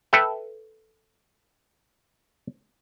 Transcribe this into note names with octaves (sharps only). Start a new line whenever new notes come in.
A4 B4 E5 G5